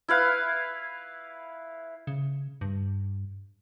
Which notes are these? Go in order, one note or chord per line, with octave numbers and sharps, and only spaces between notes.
E4 B4 F5
C#3
G2